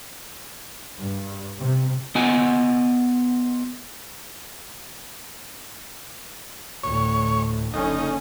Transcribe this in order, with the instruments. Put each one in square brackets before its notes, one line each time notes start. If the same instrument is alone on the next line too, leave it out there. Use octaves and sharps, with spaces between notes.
[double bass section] G2
C3
[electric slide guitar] B3 F4 D#5 F#5 G#5
[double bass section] D2 A2 [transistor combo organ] C#5
[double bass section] F#1 D3 C#4 [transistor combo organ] D#4